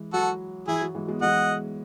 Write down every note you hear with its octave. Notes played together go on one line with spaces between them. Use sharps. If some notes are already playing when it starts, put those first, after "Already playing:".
Already playing: E3 G#3
F#3 F#4 A4
E3 E4 G#4
F#3
E3 G#3
G#3 B3
E3 G#3 D#5 F#5